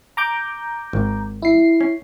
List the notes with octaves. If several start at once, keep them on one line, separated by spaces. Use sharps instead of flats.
A#5 D6 G6
G#1
E4 C7
C#4